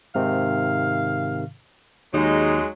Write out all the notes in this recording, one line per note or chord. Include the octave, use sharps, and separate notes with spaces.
G#2 C3 D#3 F5
D#2 F#3 G#3 D#4